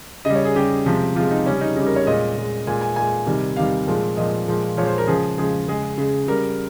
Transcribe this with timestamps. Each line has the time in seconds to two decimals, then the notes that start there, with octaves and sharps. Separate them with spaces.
0.25 C#3 G3 D#5
0.35 C#5
0.45 G#4
0.56 C#3 G3 G4
0.86 C3 F3 G#3
1.15 C3 F3 G#3 F4
1.31 D#4
1.46 C#3 G3 C#4
1.61 D#4
1.76 C#3 G3 D#4
1.86 A#4
1.96 C#5
2.06 A#2 G#3 D#5
2.36 A#2 G#3
2.67 A#2 G#3 G#5
2.81 G#5
2.96 A#2 G#3 G#5
3.27 C3 D#3 G3
3.56 C3 D#3 G3 F5
3.87 A#2 F3 G#3
4.17 A#2 F3 G#3 D#5
4.47 A#2 F3 G#3
4.77 A#2 F3 G#3 C#5
4.87 C5
4.98 A#4
5.07 C#3 F3 G#3 G#4
5.38 C#3 F3 G#3 G#4
5.68 C#3 G#3 G#4
5.98 C#3 G#3
6.28 C#3 G3 A#4